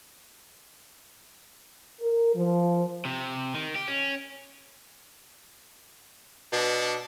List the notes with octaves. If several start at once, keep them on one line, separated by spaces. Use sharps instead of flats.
A#4
F3
C3
D#3
G4
C#4
B2 D4